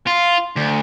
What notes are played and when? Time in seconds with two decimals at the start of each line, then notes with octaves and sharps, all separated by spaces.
0.07 F4
0.56 D2